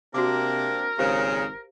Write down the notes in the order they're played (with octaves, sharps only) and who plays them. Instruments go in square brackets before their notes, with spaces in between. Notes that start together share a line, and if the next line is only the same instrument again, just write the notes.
[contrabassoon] C3 [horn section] A#3 C4 D4 [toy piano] F#4 D6 [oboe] A#4
[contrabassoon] G#1 [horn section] A#2 C#3 [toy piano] G4 C5 F5